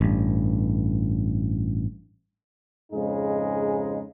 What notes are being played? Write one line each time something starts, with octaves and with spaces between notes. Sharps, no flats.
A1 G2
F2 G#2 C#3 G#3 D#4 G#4